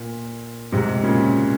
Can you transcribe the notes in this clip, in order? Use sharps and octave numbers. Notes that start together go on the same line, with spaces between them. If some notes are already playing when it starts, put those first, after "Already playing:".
Already playing: A#2
G#2 C3
A#2 C#3